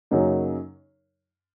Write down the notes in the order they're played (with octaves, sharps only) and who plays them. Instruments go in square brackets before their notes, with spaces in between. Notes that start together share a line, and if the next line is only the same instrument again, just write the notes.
[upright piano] F#2 C#3 F#3 A#3 D#4